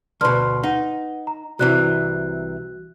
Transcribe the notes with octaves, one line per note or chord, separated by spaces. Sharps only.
D2 B2 B4 C6 F6
D#4 B4 F#5
A#5
C2 C3 E3 F#4 F#6